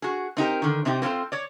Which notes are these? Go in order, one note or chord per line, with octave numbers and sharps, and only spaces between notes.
F#4 G#4
C4 D#4 G4 A#4
D3 D#3
C3 C4 D#4 G4
A#3 C4 F4 A4 C5
C#5 D5